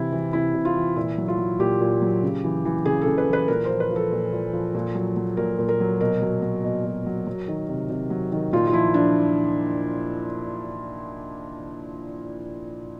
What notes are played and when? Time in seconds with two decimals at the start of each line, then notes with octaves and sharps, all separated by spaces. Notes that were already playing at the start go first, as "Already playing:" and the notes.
Already playing: C3 E3 E4
0.12 E3
0.33 C3 E4
0.54 C3
0.65 F4
0.76 E3
0.96 A#2 E4
1.18 F#3
1.28 F4
1.38 F#3
1.60 A#2 G4
1.81 A#2
2.02 F#3
2.23 C#3
2.44 E3
2.65 E3
2.85 C#3 G#4
3.01 C#3 A4
3.18 B4
3.27 E3
3.33 B4
3.48 A#2 A#4
3.65 F3 C5
3.80 B4
3.91 F3
3.96 A4
4.12 A#2
4.33 A#2
4.53 F3
4.75 A#2
4.95 F#3
5.16 F#3
5.37 A#2 A#4
5.59 A#2
5.69 A#4
5.80 F#3
6.01 B2 A#4
6.22 F#3
6.42 F#3
6.64 B2
6.85 B2
7.06 F#3
7.27 F#3
7.48 D#3
7.69 C3
7.90 C3
8.10 F#3
8.32 D#3
8.53 A#2 F4
8.67 F4
8.73 F3 E4
8.94 F3 D4